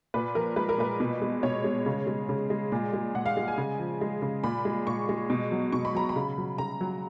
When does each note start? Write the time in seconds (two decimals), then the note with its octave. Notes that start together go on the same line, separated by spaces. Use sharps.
0.14 A#2 B4
0.35 F3 A#4
0.56 G#3 B4
0.69 A#4
0.78 A#2 B4
1.00 B2
1.22 G#3
1.43 B2 C#5
1.64 G#3
1.86 C#3
2.07 G#3
2.29 C#3
2.50 G#3
2.72 A#2
2.93 G#3
3.14 A#2 F#5
3.26 F5
3.37 G#3
3.48 G#5
3.58 C#3
3.79 F3
4.01 G#3
4.22 C#3
4.44 A#2 B5
4.65 G#3
4.87 A#2 C#6
5.09 G#3
5.30 B2
5.52 F#3
5.72 B2 C#6
5.85 B5
5.95 F#3 A#5
6.09 B5
6.16 C#3
6.38 F#3
6.58 C#3 A#5
6.81 F#3